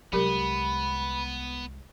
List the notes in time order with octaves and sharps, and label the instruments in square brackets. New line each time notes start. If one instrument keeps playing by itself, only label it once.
[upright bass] C2 G#3 [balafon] F#3 G4 A#4 [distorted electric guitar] B3 [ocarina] B5